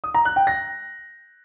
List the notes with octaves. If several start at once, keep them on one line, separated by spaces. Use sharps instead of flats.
D#6
A#5
F#6
G5
A#6